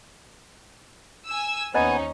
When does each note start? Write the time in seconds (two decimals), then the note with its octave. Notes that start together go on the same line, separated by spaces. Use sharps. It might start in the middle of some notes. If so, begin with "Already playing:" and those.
1.27 G#5 E6
1.74 D#2 B3 C#4 D#4 C5 D#5 G#5 A#5